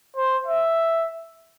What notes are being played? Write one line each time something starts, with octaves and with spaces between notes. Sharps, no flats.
C5
E5